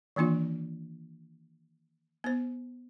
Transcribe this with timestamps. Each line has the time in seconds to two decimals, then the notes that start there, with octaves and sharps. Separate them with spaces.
0.16 D#3 E3 A#3 D4 F4
2.24 B3 C5